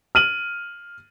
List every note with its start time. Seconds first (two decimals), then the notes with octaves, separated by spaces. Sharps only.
0.15 F6 D#7 F#7